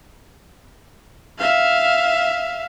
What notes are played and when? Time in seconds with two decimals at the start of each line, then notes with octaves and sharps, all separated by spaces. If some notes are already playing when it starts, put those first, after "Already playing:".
1.38 E5 F5